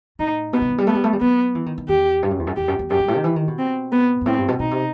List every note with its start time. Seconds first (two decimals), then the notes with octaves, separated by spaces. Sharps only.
0.19 A2 D#4
0.53 B2 B3
0.62 C3
0.70 E3
0.78 G3
0.87 A3 B3
0.95 G3
1.04 A3
1.13 G3
1.21 F#3 B3
1.55 E3
1.66 D#3
1.78 D#3
1.88 E2 G4
2.23 G2
2.31 F#2
2.39 E2
2.47 F#2
2.57 E2 G4
2.68 F#2
2.79 E2
2.90 F#2 G4
3.00 G2
3.08 A2
3.16 D#3
3.24 E3
3.36 D#3
3.48 B2
3.58 C4
3.92 B3
4.21 G2
4.26 A2 C4
4.38 G2
4.48 B2
4.59 B2 D#4
4.71 C3